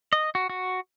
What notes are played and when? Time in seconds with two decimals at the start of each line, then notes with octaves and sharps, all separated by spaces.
0.13 D#5
0.35 F#4
0.50 F#4